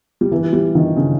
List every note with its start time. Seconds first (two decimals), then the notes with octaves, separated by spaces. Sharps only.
0.21 G3
0.32 E3
0.53 G3
0.75 D#3
0.97 C#3